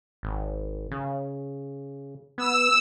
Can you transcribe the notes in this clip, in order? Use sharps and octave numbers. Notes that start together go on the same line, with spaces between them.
G#1
C#3
B3 E6